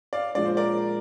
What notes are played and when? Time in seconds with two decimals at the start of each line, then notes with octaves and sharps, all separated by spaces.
0.13 D5 F5
0.35 A#2 F3 G#3 D4 D5
0.46 C5
0.57 A#4 D5